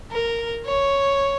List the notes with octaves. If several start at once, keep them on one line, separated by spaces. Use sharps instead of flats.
A#4
C#5